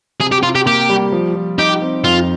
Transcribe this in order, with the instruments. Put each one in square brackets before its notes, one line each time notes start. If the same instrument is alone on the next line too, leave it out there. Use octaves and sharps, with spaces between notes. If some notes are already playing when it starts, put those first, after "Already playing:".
[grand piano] C3 [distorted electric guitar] G#4
[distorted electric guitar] G4
[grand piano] C3 [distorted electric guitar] F4
[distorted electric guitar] G4
[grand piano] A#3 [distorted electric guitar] G4
[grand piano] G3
F3
F3
[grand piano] D#4 [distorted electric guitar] G4
[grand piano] C4
[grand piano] F2 [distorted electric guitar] F4